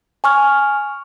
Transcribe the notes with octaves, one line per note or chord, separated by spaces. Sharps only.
G#5 C#6 F6